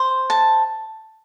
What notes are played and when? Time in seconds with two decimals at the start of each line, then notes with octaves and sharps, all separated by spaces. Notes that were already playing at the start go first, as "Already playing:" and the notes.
Already playing: C5
0.30 A5